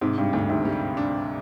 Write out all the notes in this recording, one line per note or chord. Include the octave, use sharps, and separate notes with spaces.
G#2 C3
G2
D2 G#2
G#2 C3
G3
D4